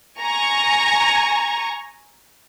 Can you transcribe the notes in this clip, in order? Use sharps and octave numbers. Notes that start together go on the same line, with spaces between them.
G#5 A#5 C#6